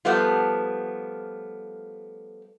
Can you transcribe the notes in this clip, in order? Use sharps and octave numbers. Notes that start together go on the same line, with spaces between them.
F3 G3 A3 B3 F4